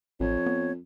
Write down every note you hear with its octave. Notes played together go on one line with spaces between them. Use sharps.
A1 F2 C#5
B3